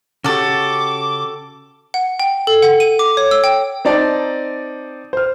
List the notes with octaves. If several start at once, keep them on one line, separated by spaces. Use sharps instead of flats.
C#3 F#4 G4 A4 D6
F#5
G5
A4
F#5
D#7
D6
C#5
E6
G5
C4 D#4 D5 A5
C5 F6